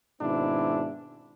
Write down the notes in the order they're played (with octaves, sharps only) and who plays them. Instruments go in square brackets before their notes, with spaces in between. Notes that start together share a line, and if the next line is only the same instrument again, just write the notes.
[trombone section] G#2 B2 D#3 C4 D4 E4